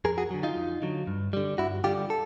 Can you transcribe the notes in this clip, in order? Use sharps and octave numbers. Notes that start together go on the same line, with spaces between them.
F2 G#4 A#4
F#4 G#4
D3 F#3
D#4 F4
F2
D3 F#3
G2
D3 G3
G2 E4 F#4
D3 G3 F4 G4
A4